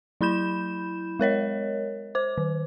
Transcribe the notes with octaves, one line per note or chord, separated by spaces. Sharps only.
F#3 E4 B5 G6 E7
G#3 A#4 C#5 D#5
C5 D6
D#3